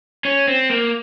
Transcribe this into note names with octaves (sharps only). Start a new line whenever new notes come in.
C#4
C4
A#3